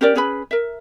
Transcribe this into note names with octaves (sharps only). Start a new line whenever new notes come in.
C#4 G4 A#4 D5
C#4 G#4 B4 B5
A#4 E5